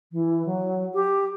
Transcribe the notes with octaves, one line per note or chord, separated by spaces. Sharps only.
E3
F#3
G4